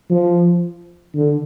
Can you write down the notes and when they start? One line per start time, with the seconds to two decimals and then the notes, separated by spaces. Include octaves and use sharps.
0.10 F3
1.15 D3